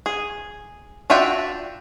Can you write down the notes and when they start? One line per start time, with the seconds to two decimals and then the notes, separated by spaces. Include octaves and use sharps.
0.06 G#4
1.10 D4 F4 F#4 E5 G5